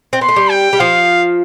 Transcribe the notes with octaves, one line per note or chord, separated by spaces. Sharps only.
C4
B3 C6
A3
G3
G5
G3
F3 F5